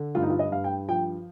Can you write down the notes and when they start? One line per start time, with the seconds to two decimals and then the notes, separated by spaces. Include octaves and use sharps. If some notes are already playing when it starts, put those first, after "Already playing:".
Already playing: D3
0.15 G2 F4
0.23 D#4
0.30 F4
0.39 D#5
0.51 G2 F5
0.64 G5
0.89 F3 G5